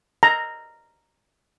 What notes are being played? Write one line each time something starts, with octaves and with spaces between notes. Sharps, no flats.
A#5